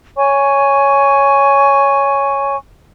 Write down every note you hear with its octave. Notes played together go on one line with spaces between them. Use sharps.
C#5 G#5 C#6